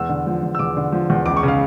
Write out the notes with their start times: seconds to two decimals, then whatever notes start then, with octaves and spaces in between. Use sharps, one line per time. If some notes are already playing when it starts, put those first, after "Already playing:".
Already playing: E2 E6
0.09 D3
0.27 F3
0.43 E2
0.55 E6
0.59 E2 D6
0.77 D3
0.92 F3
1.10 E2
1.26 C#2 D6
1.37 C#6
1.43 C#3
1.48 F5